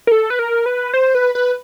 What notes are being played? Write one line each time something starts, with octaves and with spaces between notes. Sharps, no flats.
A#4
A4
B4
A#4
B4
C5
B4
B4